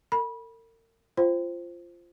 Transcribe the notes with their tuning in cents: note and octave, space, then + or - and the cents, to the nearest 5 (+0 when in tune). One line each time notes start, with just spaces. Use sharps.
A#4 -45 B5 -25
F4 -15 C5 +0 G5 +0